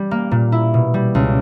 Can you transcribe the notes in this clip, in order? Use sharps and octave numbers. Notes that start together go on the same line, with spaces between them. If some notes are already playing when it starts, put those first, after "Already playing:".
Already playing: G3
A#3
A#2
E4
B2
G3
C#2